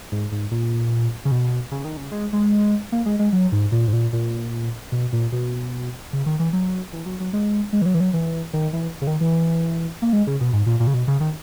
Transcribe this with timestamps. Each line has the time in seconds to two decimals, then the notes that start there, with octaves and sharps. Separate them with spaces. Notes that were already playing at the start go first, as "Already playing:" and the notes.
0.12 G#2
0.32 G#2
0.51 A#2
1.25 C#3
1.31 B2
1.71 C#3
1.85 D#3
1.97 C#3
2.12 G#3
2.33 G#3
2.92 A#3
3.06 G#3
3.19 G#3
3.33 F#3
3.52 G#2
3.72 A#2
3.87 G#2
3.93 A#2
4.13 A#2
4.92 B2
5.13 A#2
5.32 B2
6.13 C#3
6.26 D#3
6.39 E3
6.53 F#3
6.93 E3
7.06 F#3
7.20 F#3
7.33 G#3
7.73 G#3
7.82 E3
7.86 F#3
7.94 E3
8.00 F#3
8.13 E3
8.53 D#3
8.73 E3
9.01 C#3
9.07 D#3
9.21 E3
10.02 A#3
10.13 G#3
10.27 C#3
10.41 B2
10.53 G#2
10.66 A#2
10.80 A#2
10.87 C#3
10.94 B2
11.08 C#3
11.20 D#3